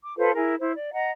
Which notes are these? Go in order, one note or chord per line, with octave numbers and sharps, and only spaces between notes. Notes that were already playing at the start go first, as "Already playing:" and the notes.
D6
F4 A4 B4 C5
E4 G#4 A#4
E4 C5
D5
D#5 F#5 A#5